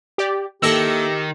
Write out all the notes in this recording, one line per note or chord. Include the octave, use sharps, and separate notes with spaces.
G4 D5
D#3 A#3 E4 G4 A4 E6 A#6 C#7